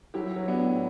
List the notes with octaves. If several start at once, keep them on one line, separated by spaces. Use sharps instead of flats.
F#3 E4 G4
F#3
B3 D4
A2